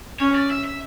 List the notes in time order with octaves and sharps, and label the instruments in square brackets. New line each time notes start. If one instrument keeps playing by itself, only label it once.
[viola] C#4 [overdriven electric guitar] C#5
[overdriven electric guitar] D5
E5
E5